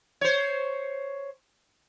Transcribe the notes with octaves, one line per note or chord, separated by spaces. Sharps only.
C5 C#5